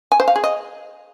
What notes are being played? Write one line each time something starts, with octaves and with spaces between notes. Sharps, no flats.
G#5
C5
F5
G#4
D#5